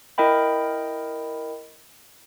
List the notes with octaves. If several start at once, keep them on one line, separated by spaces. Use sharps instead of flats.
E4 A#4 D#5 G5 B5